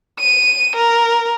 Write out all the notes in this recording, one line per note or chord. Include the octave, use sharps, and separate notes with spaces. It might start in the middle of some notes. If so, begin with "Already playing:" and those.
D#7
A#4